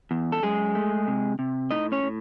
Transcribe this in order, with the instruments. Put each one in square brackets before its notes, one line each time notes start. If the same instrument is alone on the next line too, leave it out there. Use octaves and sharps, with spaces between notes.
[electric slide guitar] E2
A4
F#2 G#3 G#4
A3
C3
C3
A2 D#4 D#5
C#4 C#5
A2